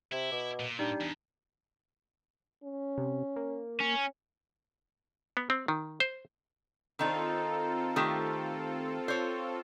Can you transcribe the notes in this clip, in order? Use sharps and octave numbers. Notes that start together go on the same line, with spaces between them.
C3 E4
B2 D6
A#2
G3 D4 D#4
E2
C#4
C3
A#3
C#4
B3
C4
D#3
C5
D#3 C4 D#4 F4 A4
D#3 A3 G4
C5 C#5